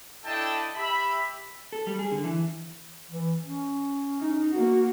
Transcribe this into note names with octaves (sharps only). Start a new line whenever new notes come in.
D4 E4 A4 D#5 G5 A5
G4 E5 B5
A4
G3
G#4
D3
E3
E3
C#4
D#4
A#3 F#4